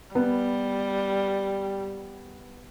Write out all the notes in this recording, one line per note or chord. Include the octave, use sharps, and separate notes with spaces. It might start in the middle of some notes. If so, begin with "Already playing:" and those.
G3 B3